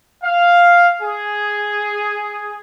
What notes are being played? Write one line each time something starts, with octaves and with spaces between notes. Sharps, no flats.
F5
G#4